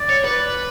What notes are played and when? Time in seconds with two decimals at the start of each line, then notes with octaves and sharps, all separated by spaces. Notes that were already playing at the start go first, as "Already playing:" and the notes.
Already playing: D5
0.09 C#5
0.24 B4